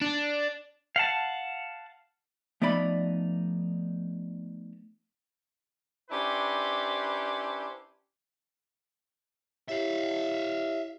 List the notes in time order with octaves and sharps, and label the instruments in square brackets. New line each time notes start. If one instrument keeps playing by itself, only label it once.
[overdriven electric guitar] D4
[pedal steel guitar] F5 F#5 A5
[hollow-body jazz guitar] F3 A3 B3 D#4 D5 B5
[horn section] C#4 D4 E4 G4 B4 C5
[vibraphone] E4 G4 C#5 [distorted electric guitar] E5 F5